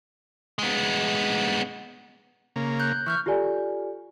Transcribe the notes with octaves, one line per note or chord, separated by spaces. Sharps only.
G#3 B3
C#3 A#3
F#6 G6
E3 C#6 F6 G6
F4 G4 A4 D5 G#5